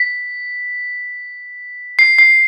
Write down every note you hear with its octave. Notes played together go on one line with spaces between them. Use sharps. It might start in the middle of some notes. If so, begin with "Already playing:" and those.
Already playing: B6
C7
C7